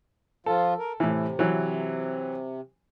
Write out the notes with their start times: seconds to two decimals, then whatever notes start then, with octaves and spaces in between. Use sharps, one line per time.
0.46 F3 F4 A4
0.78 A#4
1.00 A2 C3 E3
1.39 E3 F#3